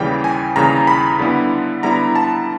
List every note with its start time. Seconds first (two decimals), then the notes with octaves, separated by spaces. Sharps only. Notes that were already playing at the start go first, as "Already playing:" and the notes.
Already playing: D#2 C#3 E3 G3 G5
0.24 G#5
0.56 D#2 C#3 E3 G3 A#5
0.87 B5
1.19 D3 G3 B3 E4
1.83 D3 G3 B3 E4 A#5
2.15 A5